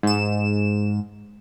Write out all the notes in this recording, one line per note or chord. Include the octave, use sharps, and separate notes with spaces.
G#2 E7